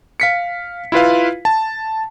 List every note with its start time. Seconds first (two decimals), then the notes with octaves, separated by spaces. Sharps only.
0.20 F5 B6 C#7
0.92 E4 F4 B4 F5
1.45 A5